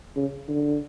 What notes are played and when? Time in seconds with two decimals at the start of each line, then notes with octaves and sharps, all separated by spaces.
0.16 C#3
0.48 D3